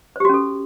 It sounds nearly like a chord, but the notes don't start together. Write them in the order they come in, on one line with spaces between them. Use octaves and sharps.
C5 G4 F#4 C#4 A4